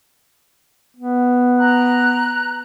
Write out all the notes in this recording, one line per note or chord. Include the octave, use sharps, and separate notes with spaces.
B3
A#5 F#6